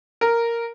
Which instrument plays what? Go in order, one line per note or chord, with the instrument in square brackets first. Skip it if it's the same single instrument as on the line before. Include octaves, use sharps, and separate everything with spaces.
[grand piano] A#4